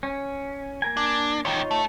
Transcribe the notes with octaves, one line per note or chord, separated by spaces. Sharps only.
C#4
A#3 A#4 G#5
D4
E2 D#3 D#4 F4 C#5
A3